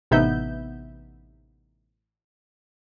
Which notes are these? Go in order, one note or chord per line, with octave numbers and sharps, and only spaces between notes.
A1 C3 B3 D#4 E5 G6